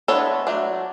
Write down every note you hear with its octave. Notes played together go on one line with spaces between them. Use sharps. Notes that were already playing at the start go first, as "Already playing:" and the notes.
E3 G#3 B3 D4 A4 C#5
F#3 A3 D4